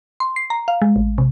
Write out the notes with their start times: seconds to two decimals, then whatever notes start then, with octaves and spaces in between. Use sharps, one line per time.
0.20 C6
0.36 C7
0.50 A#5
0.68 F5
0.82 G#3
0.96 A1
1.18 C3